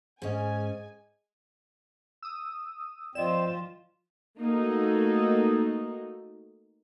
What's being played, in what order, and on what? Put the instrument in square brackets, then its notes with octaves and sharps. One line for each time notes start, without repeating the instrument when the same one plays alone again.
[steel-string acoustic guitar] G#2 C#4 [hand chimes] G#4 D#5 [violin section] G#5
[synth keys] D#6 E6
[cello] F3 F4 [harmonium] C4 [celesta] D5 D#5 [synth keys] E7
[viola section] A3 A#3 D#4 F#4 A4 D#5